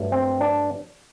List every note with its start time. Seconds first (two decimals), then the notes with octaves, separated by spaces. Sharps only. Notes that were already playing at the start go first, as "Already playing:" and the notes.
Already playing: G2 F#3 A3
0.12 C4
0.41 D4